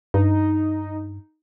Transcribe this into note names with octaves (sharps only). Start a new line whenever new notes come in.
G2 D#4